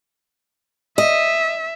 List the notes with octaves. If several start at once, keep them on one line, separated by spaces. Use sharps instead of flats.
D#5 E5